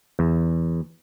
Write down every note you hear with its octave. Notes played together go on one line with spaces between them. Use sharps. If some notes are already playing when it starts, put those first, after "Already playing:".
E2